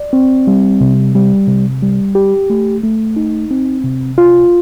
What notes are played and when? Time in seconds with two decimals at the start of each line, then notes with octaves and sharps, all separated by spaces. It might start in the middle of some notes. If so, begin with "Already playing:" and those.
Already playing: D5
0.13 C4
0.47 G3
0.81 C3
1.15 G3
1.48 C3
1.82 G3
2.15 G4
2.50 A3
2.84 A3
3.16 D#4
3.51 C4
3.84 C3
4.18 F4